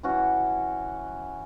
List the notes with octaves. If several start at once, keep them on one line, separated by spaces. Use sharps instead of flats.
E3 C#4 F#4